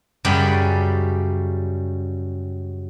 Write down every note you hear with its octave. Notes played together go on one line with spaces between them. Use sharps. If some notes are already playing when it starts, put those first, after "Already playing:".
F#2 C#3 G3 C#4 D5 B5